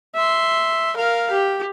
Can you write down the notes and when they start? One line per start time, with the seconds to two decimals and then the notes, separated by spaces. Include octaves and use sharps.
0.15 E5 C6
0.96 A#4 F5
1.31 G4